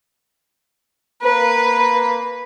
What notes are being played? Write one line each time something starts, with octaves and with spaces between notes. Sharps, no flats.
A#3 B4